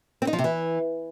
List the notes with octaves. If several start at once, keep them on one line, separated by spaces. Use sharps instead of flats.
C4
D#4
F3
C3
E3